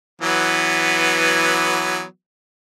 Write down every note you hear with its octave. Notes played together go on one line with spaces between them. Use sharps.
E3 F#3 B3